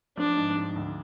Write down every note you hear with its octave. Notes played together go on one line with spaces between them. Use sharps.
F3 D4
G#2
G#2
D2